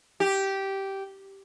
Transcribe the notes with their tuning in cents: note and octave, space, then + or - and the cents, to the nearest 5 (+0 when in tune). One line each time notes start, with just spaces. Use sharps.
G4 -10